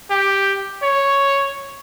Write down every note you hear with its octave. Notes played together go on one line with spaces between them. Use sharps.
G4
C#5